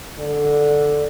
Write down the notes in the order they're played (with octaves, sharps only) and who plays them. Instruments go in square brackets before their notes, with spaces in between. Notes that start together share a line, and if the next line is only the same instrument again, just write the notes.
[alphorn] D3